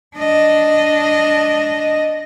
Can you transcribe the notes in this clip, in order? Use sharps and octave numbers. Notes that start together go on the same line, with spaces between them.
D4 D#5